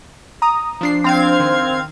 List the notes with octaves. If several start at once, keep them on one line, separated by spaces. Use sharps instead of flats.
A#5 D#6
F3 D4 C7
C4 F5 G#6
D#3